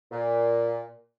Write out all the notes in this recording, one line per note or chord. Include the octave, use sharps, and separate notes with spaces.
A#2